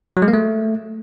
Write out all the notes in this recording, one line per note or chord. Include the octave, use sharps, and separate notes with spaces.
F#3
G#3
A#3
A3